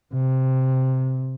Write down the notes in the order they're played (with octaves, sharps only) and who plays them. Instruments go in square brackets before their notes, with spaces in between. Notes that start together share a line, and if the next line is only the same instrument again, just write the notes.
[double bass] C3